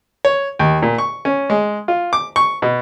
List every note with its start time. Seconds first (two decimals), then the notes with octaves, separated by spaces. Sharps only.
0.25 C#5
0.59 D#2
0.82 A#2
0.98 C#6
1.25 C#4
1.50 G#3
1.88 F4
2.13 D6
2.36 C#6
2.62 B2